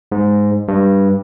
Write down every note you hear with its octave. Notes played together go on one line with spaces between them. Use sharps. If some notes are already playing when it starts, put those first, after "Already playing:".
G#2
G2